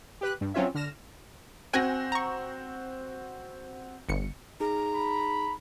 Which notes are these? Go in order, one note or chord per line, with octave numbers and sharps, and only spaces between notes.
G4 B4 F#6
G2
F#3 C4 C#4 F4 C#5 E5
D3 F6 A#6 E7
C4 F#4 G5 G#5 F#6 A#6
A#5 C#6
G1 C#7
D#4 G#4 A#5
B5